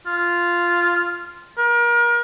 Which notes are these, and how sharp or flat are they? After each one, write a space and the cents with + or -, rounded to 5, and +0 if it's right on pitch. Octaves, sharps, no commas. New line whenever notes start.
F4 -5
A#4 +35